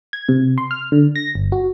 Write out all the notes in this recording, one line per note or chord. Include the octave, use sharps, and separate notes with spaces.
G#6
C3
C6
F6
D3
A#6
G1
F#4